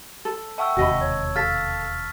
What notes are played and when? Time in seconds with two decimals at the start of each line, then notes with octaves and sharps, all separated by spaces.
0.25 A4
0.58 E5 F#5 G5 A5 C#6 E6
0.77 E1 D#2 C3 F#4 D#5 B5
1.01 C#5
1.36 A4 F5 A5 F6 A6 B6
1.85 F6